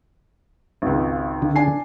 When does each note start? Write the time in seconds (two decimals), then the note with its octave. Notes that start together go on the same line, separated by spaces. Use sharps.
0.82 G#1 C#2
1.42 D3
1.56 D4 G#5 C7